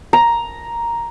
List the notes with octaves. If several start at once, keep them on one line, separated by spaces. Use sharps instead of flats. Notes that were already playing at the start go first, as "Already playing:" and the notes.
A#5